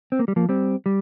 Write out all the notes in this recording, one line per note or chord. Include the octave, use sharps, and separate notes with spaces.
C4
A#3
G3
F3 A#3
G3 C4
G3